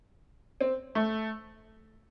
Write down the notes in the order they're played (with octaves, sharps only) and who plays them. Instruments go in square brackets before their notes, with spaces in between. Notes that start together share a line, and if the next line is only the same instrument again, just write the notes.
[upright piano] C4
A3